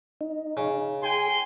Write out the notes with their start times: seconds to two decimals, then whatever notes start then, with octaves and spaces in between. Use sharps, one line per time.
0.21 D#4
0.57 C#3
1.03 G#4 G5 G#5 C6